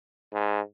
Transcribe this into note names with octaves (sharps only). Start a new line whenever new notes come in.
G#2